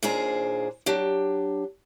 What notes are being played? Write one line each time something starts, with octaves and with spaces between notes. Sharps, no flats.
D#2 A#2 D4 G#4 C5 A#5
F#3 D4 G4